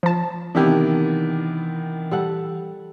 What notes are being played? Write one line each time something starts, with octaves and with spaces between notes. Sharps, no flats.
F3 A5
C3 D#3 E3 B3 D4 E4 G4
G3 A4 F#5